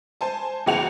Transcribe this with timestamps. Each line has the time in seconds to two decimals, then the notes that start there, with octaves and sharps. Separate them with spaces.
0.21 C5 G#5 A5
0.66 F#1 E2 F#4 F#5 F7